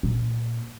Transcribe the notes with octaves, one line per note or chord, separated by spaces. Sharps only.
A#2